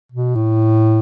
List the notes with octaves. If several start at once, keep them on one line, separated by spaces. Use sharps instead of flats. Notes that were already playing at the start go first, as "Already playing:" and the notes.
B2
A2